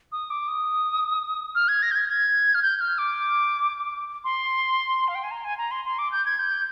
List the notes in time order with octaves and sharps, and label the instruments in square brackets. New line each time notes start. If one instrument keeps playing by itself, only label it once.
[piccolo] D#6
D6
D#6
F6
G#6
A#6
G6
G#6
G#6
F6
G6
F6
D6
C6
F5
G5
G#5
A#5
G#5
A#5
C6
C6
D6
G6
G#6
G6